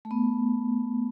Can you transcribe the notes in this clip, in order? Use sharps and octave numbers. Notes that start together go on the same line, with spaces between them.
A3
B3